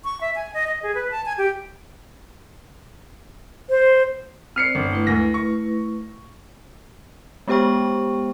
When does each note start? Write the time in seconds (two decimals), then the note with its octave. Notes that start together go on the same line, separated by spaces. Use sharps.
0.04 C#6
0.21 E5
0.36 G#5
0.54 D#5
0.67 D#5
0.83 G#4
0.95 B4
1.11 A5
1.26 G#5
1.38 G4
3.70 C5
4.56 C4 C5 D5 F6 C7 C#7
4.75 G1
4.91 A3 E4 B4
5.07 D2 A#6
5.34 C#6
7.48 G#3 B3 G4 C5 G5 C#6